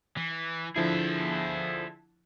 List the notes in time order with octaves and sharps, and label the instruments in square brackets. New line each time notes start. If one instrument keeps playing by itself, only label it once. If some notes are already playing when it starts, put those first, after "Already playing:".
[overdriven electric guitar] E3
[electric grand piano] D3 F3 E4 [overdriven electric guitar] G#4 E5